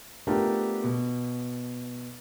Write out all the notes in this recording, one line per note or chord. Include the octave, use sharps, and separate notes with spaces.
A3 B3 D4 F4 G4 A#4
B2